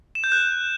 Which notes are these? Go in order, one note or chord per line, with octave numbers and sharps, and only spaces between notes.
E7
G6
F#6